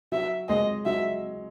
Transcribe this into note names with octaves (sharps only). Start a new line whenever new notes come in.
F#3 E5
G#3 D#5
F#3 E5